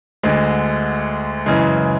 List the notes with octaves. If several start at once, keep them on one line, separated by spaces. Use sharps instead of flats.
D2 D3 G#3
F#2 C#3 E3 G#3